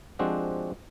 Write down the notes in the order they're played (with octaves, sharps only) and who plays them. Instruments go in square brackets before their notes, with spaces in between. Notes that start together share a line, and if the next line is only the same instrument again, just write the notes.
[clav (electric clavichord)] F3 G#3 C4 D4 F#4 G4